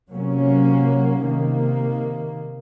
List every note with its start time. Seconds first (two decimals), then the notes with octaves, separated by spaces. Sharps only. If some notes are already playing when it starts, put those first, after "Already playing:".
0.10 C3 F#3 A#3 C#4
1.21 C3 D#3 A#3